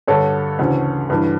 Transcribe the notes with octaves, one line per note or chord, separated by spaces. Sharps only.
G2 D3 A4 C#5
D2 C#3 E3
G2 E3